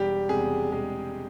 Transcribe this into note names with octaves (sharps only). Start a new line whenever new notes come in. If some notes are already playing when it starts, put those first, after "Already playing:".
Already playing: E1 G3 G4
E2 C3 G#3 G#4
E1 G#3 G#4